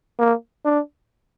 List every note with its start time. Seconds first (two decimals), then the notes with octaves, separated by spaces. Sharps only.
0.19 A#3
0.65 D4